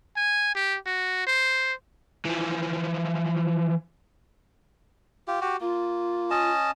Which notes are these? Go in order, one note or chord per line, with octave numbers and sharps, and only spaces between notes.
G#5
G4
F#4
C5
E3 F3
F4 G4
F#4 G4
A#3 F4
C#4 D#5 A5